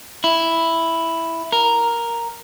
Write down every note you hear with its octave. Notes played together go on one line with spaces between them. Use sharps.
E4
A#4